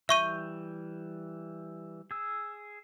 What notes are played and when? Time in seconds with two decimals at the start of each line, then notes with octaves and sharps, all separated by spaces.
0.09 E3 G3 E5 C#6 G6 D#7
2.11 G#4 E6